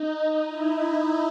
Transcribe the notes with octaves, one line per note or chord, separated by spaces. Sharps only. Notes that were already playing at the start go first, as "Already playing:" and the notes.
Already playing: D#4
E4